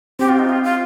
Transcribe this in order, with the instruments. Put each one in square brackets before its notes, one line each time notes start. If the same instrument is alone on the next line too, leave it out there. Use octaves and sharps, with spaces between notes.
[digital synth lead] C4 [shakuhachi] G4
[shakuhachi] F4
D#4
F4
F4